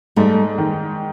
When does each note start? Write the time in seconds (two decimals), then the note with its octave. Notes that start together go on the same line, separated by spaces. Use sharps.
0.16 G#2 G3 A3
0.58 D#3